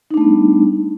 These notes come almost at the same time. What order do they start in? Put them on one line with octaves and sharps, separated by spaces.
D#4 D4 A3 B3 G3